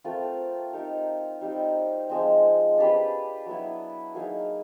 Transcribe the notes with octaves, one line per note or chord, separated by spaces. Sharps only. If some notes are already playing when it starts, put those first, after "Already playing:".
A3 C4 F4 A#4
D#4 G4 A#4
G3 C4 D#4 G4
F3 G#3 C4
D4 G4 B4
F#3 B3 E4
F#3 A#3 D#4 G#4